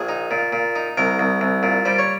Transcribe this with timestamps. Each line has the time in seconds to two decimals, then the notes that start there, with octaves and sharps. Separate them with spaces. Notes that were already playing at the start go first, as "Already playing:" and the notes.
Already playing: A#1 G#4
0.09 D#4
0.31 A#2
0.53 A#2
0.76 D#4
0.97 C2 A#4
1.19 C2
1.41 C2
1.63 A#2
1.85 G3 C5
1.98 C#5